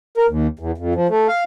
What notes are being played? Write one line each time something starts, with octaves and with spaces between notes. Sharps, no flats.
A#4
D#2
E2
F2
F3
A3
F5